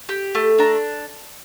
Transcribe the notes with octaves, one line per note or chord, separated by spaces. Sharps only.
G4
A3
D4 A#5